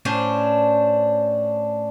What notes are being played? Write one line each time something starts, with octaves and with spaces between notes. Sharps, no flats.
A2 C#4 D4 C5